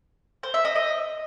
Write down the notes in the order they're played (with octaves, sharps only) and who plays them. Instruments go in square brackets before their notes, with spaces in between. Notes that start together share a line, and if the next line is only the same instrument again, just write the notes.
[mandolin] C5
E5
D#5
D#5